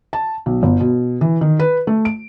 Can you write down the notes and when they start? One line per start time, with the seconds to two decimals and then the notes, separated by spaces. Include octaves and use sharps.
0.13 A5
0.46 B1
0.63 G1
0.80 B2
1.21 E3
1.41 D#3
1.59 B4
1.87 A3
2.05 D7